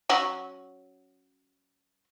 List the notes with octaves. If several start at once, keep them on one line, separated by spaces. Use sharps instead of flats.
F#3 C#4 F#4